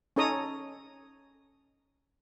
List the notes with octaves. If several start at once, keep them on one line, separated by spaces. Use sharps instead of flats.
C#4 D#4 A4 C#5 A#5 D#6